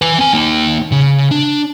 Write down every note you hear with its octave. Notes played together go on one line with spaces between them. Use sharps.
B4 G#5
C4 G#5
A#3 D#4
C#3
D4